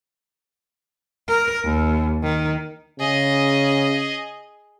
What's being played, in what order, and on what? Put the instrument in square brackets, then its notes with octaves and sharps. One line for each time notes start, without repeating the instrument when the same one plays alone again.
[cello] A#4
D#2
D#3
[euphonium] C#3 [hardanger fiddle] G#4 D#5